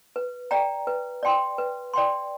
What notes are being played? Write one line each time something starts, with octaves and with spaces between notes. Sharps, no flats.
B4
D5 G5 A#5
B4
D5 G5 C6
B4
D5 G5 C6